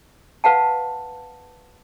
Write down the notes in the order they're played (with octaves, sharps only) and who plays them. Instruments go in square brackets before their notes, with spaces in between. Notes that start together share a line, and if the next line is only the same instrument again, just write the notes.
[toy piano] B4 F5 F#5 A5